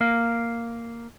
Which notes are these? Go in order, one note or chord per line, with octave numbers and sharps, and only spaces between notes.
A#3 F5